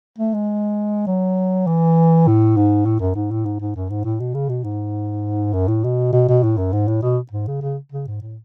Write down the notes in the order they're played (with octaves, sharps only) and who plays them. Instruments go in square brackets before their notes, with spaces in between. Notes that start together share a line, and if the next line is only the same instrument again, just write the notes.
[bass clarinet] A3
G#3
F#3
E3
A2
G#2
A2
F#2
G#2
A2
G#2
G#2
F#2
G#2
A2
B2
C#3
B2
G#2
F#2
A2
B2
B2
B2
A2
F#2
G#2
A2
B2
G#2
C#3
C#3
C#3
G#2
A2